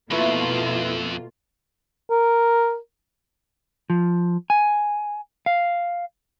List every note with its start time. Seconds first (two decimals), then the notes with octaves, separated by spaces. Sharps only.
0.11 F2 B2 A3 A#3 E4 F4 B4 E5
2.10 A#4
3.90 F3
4.50 G#5
5.46 F5